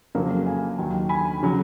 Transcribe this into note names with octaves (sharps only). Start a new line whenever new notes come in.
F2 C#3 F#3 A#3
F5 G#5
D#2 D#3 F#3
G#5 B5
C#3 F#3